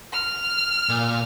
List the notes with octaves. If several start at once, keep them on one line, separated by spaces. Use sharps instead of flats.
F6
A#2